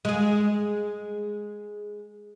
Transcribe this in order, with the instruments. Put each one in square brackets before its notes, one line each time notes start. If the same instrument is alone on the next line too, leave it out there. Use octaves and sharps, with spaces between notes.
[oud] G#3 G#4